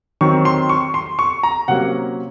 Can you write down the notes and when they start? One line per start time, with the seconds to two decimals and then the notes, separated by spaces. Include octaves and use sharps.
0.21 D#3 F#3 C4 C#6
0.45 C6
0.69 C#6
0.94 C6
1.19 C#6
1.43 A#5
1.68 C3 F#3 A#3 C#4 F#5